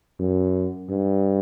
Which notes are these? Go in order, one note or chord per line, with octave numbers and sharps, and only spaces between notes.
F#2
G2